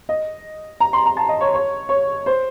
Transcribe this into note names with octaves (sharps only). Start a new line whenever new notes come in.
D#5
A#5
C6
A#5
A5
D#5
C#5
C#5
C#5
C5